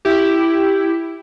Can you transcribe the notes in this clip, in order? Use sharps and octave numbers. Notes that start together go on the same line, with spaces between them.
E4 G4